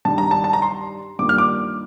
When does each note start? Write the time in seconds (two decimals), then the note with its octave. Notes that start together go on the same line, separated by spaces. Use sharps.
0.05 G2 D#3 G3 D4 A5
0.18 A#5
0.31 A5
0.44 A5
0.53 A#5
0.62 C6
1.19 G2 D#3 G3 A#3 F4 D6
1.29 F6
1.38 D6